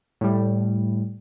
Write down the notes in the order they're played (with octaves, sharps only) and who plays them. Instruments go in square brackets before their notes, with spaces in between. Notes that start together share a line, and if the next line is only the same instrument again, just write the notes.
[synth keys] A2 G3